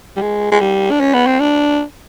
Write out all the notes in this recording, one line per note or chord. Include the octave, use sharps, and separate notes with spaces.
G3
G#3
G#3
G3
D4
C#4
B3
C4
D4